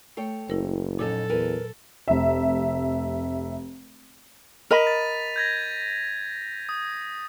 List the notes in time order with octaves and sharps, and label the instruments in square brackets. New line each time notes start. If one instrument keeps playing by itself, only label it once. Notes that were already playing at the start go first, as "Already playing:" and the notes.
[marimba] A3 [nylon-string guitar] A4 C#5 G5
[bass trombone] F#1 [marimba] E4 A#4 C5
[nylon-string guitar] F2 C#4 D#4 [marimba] A#2 F#3 [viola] A4
[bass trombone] E2 [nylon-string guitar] A#4 B4 G#5
[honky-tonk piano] F1 E5
[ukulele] A#4 D#5 B5 [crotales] B6 D#7 F7
[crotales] A6
G6 G#6 A#6
D#6